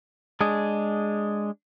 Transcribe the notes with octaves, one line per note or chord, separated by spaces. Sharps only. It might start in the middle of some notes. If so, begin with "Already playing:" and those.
G#3 D4 G#4